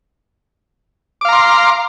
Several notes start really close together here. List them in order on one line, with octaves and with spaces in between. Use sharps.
D6 F5 A#5 C6